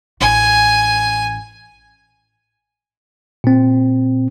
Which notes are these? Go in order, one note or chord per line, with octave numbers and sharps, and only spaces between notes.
A1 G#5
A#2 C4